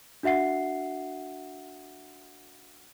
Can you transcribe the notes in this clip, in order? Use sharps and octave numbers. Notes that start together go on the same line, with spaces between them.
D4 F#4 E5 F#5 C7